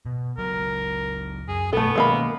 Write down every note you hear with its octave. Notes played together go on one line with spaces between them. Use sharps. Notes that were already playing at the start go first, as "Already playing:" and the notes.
B2
C#2 F#3 A#4
F#2 G#4
B1 G2 B2 A3 B3 A4
B2 D#3 G#3 A#3 B5